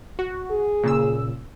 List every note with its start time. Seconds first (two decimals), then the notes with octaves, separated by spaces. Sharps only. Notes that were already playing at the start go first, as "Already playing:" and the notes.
0.19 F#4
0.51 G#4
0.84 A#2 C#3 E6